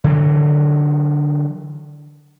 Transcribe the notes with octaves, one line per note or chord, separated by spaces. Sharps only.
D3 E3 F#3